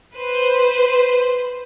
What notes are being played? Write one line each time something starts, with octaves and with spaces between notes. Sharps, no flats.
B4 C5